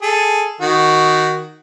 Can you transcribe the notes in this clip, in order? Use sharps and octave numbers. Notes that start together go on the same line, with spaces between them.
G#4 A4
D#3 F#4